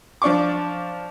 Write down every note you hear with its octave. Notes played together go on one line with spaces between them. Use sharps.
F3 D4 D5 C#6 D6